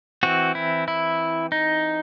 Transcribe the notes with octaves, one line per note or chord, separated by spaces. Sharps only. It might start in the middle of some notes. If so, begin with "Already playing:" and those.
E3 C4 F#4
E4
E4
D#4